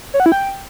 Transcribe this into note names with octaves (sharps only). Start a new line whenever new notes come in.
C#5
F#5
E4
G5